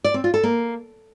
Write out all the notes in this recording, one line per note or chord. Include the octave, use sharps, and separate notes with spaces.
D5
C4
F4
A4
A#3